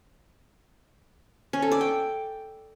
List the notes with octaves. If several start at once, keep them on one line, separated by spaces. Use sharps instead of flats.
C#4
A4
D5
G5